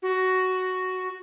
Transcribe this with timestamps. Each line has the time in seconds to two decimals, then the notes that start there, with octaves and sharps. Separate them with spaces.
0.02 F#4